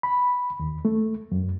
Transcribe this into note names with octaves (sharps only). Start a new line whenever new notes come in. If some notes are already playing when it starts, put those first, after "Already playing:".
B5
D#2
A3
F#2